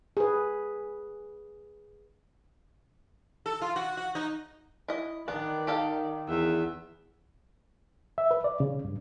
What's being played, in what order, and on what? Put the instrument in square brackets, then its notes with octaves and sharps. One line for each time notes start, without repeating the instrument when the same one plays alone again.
[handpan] G#4 B4
[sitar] A4
F4
F#4
F#4
D#4
[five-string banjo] E4 D#5
[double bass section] D#3 [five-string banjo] B3 D4 [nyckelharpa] D5
[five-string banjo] G4 A4 F5
[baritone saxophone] E2 [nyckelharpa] E5
[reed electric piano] E5
B4
D5
C#3
G2